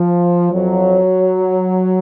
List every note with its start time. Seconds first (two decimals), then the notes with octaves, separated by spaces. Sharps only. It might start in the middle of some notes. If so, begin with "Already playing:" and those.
Already playing: F3
0.51 F2 F3 F#3